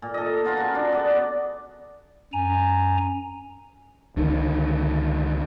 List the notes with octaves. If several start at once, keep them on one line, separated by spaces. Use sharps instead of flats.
A#2
A4 D#5
B3 F4 B4 A#5
C#3 F#4
D4
B3 D5
F#2 G#5 A#5
C#2 D3 D#3